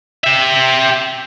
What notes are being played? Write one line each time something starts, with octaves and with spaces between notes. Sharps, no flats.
G4 E5